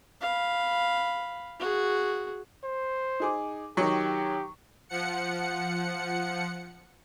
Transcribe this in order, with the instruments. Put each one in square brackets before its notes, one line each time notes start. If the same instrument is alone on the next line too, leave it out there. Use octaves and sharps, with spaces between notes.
[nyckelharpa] F5 B5
F#4 G#4
[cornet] C5
[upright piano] D#4 G#4 D6
[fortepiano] D#3 F#3 [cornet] G4 [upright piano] C#6
[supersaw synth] F3 F#5 C#7